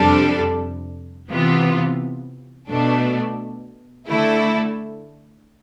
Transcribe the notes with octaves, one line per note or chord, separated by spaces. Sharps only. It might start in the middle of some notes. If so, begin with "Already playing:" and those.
Already playing: F2 C3 G3 D4 A4
C3 E3 B3 F4
B2 A3 D4 A4
D3 A3 E4 A4